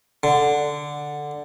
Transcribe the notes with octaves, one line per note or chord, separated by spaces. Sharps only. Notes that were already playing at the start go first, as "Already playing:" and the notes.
D3